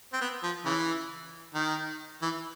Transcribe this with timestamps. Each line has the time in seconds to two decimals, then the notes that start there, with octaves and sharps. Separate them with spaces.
0.13 C4
0.21 B3
0.43 F3
0.65 C#3 E3
1.55 D#3
2.22 E3